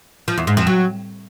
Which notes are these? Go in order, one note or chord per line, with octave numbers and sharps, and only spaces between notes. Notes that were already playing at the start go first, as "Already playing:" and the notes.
F3
E2
G#2
F2
F#3